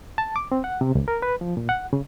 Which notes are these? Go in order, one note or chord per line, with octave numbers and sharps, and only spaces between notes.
A5
D6
C4
F#5
C3
C#2
A#4
B4
F3
A#2
F#5
C#3